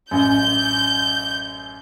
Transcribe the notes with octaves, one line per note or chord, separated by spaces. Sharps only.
A1 F#2 G6